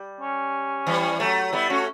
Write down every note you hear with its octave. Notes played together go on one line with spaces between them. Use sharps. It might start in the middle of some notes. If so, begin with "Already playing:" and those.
Already playing: G3
C#4
E3 G3
F#3 A3
G3 B3 E4
A3 C#4 F#4